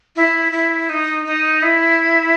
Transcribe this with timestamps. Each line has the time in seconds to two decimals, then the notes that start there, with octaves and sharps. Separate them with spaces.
0.16 E4
0.52 E4
0.89 D#4
1.26 D#4
1.62 E4